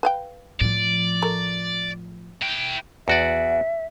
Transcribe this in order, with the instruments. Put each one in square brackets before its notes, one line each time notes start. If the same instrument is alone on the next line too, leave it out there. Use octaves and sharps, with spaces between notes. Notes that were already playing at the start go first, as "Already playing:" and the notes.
[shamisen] B4 F5 G5
[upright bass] A2 F3 [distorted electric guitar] D5
[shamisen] A3 A#4
[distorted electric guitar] E4 G5
[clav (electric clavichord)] E2 F#4 D5 [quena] E5